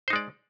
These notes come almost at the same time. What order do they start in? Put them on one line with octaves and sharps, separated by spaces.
C5 D#4 G#3 D5